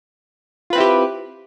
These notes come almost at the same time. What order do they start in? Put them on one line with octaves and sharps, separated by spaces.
F4 B4 C4 E4 G4